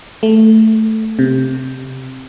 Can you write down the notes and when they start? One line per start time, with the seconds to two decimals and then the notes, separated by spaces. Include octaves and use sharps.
0.23 A3
1.19 C3